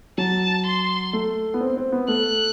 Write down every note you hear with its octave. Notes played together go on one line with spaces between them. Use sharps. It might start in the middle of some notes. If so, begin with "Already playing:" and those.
F#3 A5
C6
A3
B3
C4
C4
B3
A3 F#6